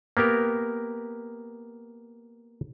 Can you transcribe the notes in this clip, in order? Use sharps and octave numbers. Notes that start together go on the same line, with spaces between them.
A#3 B3 G4 A#4